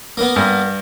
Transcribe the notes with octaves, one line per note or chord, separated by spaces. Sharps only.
A#3 B3
G2